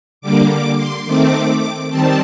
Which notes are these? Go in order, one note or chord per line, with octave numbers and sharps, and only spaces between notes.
D3 G3 A#3 D6
D6
C6
D#3 A3 C4 D6
D#3 G3 C4 A5